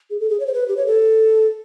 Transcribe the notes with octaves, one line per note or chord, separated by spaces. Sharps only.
G#4
A4
G#4
C#5
C5
B4
G4
C#5
A4